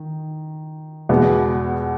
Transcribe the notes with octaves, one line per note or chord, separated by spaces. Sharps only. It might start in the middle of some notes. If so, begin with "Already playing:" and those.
Already playing: D#3
E2 B2 G#3 B3